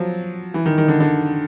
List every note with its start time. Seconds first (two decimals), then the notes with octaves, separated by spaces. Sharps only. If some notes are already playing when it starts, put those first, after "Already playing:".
Already playing: F3 F#3
0.54 E3
0.66 D#3
0.78 D#3
0.88 D3
1.00 D3